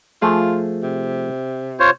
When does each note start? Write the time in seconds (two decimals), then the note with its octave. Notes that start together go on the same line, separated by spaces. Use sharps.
0.22 F3 A3 F4 G#4
0.83 C3
1.80 F4 C5 C#5